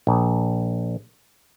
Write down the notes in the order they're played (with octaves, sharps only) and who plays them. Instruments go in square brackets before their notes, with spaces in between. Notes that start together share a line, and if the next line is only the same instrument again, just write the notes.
[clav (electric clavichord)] A#1